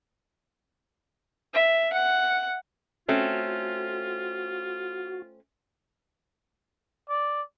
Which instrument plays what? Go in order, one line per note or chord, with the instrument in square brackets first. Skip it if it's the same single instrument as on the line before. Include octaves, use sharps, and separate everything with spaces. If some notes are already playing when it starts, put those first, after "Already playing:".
[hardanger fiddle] E5
F#5
[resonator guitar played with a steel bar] A3 C4 C#4 [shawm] F4 [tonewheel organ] F#4
[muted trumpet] D5